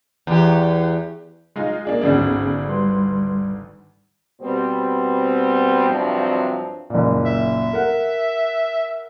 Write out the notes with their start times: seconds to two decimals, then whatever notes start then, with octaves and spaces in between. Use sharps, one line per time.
0.27 E2 G4
1.56 G#3 D#4 F4
1.85 A#3 D4 G#4
2.01 G#1 D2 B3 C#4 D4 G#4
2.69 G3 B4 C6
4.41 B2 G3 B3 C4
5.87 G2 C3 F3 F#3 C4 D4
6.90 F#1 A#2
7.26 E5
7.73 A#4 F#5